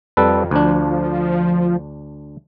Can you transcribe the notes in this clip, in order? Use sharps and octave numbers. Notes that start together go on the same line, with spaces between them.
F2 G3 A4 B4
D2 F3 D4